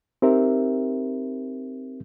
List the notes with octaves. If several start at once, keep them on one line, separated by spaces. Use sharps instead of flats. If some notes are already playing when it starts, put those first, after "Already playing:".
C4 D#4 G4 A#4 E5